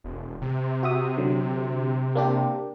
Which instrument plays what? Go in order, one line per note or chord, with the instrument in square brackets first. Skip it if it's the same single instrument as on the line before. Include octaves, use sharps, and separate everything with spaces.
[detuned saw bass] E1
C3
[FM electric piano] F#4 E5 D#6
D3 F#3
A#3 D4 G4